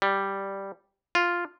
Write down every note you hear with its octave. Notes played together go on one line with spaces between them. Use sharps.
G3
F4